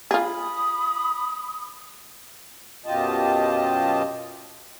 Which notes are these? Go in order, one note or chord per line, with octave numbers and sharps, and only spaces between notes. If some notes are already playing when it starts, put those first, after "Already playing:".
F4 G#4 B5 D#6
F#2 B2 F4 G4 D#5 A5